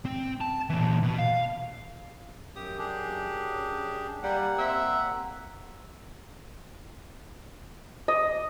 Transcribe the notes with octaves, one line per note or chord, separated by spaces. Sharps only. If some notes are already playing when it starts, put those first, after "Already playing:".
C4
A5
A#2 E3
B2
F5
F#2 G4 D#6
D4 G4 G#4
G3 A#3 F#5
C4 E5
D#5